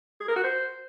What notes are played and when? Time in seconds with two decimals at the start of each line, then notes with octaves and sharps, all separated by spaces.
0.20 G#4
0.28 A#4
0.36 F#4
0.44 C5